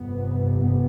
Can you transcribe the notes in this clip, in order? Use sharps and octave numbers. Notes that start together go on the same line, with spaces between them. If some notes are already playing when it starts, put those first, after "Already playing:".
Already playing: G1 F2 C3 B3
B3